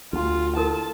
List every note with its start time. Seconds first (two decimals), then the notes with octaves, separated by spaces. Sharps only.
0.13 D2 F4
0.56 E4 A4 A#4 A5